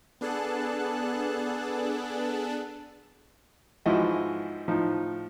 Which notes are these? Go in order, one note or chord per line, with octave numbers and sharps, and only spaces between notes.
B3 D4 G#4 A4 A5 F#6
G#2 E3 F3 E4 F#4 D#5
A2 F3 D#4